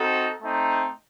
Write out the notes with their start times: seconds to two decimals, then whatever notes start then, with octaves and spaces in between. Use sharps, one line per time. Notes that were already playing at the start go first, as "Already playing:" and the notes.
Already playing: C4 D#4 F#4 A4
0.41 A3 C4 D#4